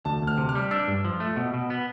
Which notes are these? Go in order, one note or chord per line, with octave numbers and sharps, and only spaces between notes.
D2 A5
D2
F6
C3
F6
G3
D4 E6
G2
F3
A3
B2
B2
B3